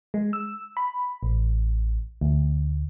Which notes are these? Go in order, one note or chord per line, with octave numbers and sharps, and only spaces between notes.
G#3
E6
B5
A1
D2